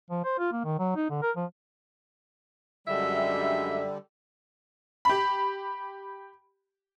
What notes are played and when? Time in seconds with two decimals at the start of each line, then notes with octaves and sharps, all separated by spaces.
0.11 F3
0.24 C5
0.39 F4
0.52 A#3
0.64 D#3
0.79 F#3
0.96 D#4
1.10 D3
1.22 A#4
1.36 F3
2.88 F#2 D3 G3 G#3 E5
5.05 G4 B5